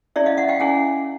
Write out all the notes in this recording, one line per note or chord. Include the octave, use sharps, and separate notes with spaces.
C#4 E4 G#4 D5 E5
D#5 F5
E5 F#5
F5 G5
C#4 E4 G#4 F#5 G#5